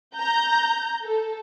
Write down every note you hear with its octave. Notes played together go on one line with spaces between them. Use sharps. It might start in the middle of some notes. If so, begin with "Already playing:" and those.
A#5 G6
A4